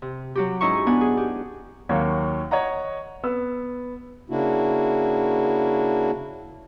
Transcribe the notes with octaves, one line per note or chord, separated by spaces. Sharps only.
C3
F#3 F#4 G4
G#2 C#4 D#4 E4 C#6
B3 D4 F#5 G#5
G#4
G4
D#2 F#3 A#3 F#4 C#5 C#6
C#5 D#5 F#5 A#5
B3 E6
C#3 A#3 D4 E4 F#4